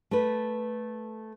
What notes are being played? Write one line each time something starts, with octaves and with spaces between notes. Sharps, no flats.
A3 B4